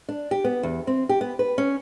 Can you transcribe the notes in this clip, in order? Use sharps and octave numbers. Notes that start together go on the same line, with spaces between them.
D4
G4
B3
E2
C4
G4
B3
B4
C#4